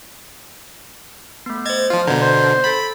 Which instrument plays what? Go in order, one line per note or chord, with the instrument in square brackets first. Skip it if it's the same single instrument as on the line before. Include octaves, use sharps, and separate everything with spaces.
[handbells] A3 B3
[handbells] C5 D#5 [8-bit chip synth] G#6 A6
[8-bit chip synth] F3 F4
[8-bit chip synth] B2 D3 [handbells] A#5 G6 G#6
[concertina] C5
[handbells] A4 A6 B6 [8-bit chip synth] B5